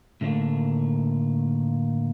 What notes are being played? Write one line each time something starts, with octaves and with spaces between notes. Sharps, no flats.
A2 D3 D#3 F#3 A3 A#3